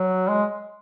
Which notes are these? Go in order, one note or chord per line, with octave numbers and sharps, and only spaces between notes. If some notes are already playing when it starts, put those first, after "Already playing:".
Already playing: F#3
G#3